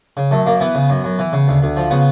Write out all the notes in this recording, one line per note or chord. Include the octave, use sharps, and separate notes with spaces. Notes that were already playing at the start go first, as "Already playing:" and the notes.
C#3
F#2 A3
F#2 A#3
E3 B3
C#3
F#2
F#2
E3
C#3
D2
D2
F3
C#3 B3